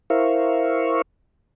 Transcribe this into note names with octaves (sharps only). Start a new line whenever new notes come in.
E4 A#4 C5 E5 F5 C#6